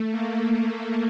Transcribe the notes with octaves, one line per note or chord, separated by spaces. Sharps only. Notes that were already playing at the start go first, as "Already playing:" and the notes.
Already playing: A3
A#3